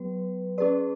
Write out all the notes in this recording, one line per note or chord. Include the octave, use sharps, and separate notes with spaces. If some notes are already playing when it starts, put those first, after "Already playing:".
Already playing: F#3 B3 B4
C#4 G#4 B4 D5